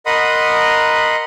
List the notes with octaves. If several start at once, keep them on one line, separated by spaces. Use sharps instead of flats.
A#4 D#5 F#5 B5 C6 D#6